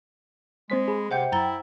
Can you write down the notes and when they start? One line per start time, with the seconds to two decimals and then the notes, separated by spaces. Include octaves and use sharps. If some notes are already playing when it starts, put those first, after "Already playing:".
0.70 G#3 C4 C5 B6
0.88 G#4 B5
1.11 C3 C5 F#5 G5 G6
1.32 F#2 E4 A#5 A6 G7